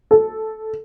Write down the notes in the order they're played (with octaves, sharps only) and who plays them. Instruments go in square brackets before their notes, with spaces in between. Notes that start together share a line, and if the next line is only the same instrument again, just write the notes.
[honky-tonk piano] A4